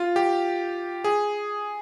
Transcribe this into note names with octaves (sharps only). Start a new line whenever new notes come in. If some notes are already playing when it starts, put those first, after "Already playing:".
Already playing: F4
G4
G#4